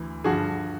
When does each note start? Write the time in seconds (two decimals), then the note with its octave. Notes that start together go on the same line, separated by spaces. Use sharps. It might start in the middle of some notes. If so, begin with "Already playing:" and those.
Already playing: D2 E3
0.24 G2 D3 F3 F#4 G#4